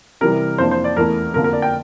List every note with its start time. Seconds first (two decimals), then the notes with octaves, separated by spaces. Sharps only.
0.21 C3 E3 G3 A#4
0.58 F2 E3 A#3 D4 C5
0.71 C5
0.84 D5
0.97 E2 E3 A3 E4 A#4
1.34 F2 D3 F3 A#3 A#4
1.44 A#4
1.53 D5
1.62 G5